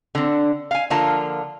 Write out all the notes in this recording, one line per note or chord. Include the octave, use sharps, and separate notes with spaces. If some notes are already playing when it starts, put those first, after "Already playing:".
D3 C4
F5 G#5
D3 F3 A#3 F4 A5